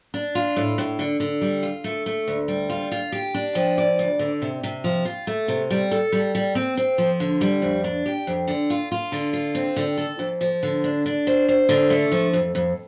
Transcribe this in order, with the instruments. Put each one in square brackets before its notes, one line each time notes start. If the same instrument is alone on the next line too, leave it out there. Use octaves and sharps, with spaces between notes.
[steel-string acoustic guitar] D4
F4
A2
A2
D3
D3
G3
F4
A3
A3
D2
G3
F4
F4
G4
D4
F3
D5
D2
D3
C3
C3
F3
F4
A3
C3
G3
A4
G3
G3
C4
C4
F3
D3
G3
F2
D4
G4
F2
D3
F4
F4
D3
F4
C4
D3
A4
F2
F3
D3
D4
D4
C5
C5
D3
A3
F3
F2
F2